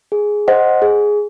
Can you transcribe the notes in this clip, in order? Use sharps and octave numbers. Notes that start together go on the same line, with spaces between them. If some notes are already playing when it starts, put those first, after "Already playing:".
G#4
C5 D#5 F#5
G#4